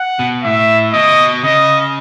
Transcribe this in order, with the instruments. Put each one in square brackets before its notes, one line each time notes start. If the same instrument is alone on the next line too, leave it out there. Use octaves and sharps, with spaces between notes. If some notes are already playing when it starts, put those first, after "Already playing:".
Already playing: [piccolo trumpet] F#5
[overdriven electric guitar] B2
[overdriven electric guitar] A2 [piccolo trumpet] E5
[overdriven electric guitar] B2 [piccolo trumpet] D#5
[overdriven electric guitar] C#3 [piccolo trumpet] D#5